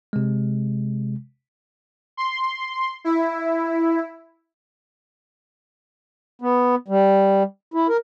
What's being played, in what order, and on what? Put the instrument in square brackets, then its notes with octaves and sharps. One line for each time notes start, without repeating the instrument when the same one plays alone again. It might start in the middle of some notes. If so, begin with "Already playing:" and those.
[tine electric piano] C3 G#3
[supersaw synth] C6
E4
[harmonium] B3
G3
E4
A#4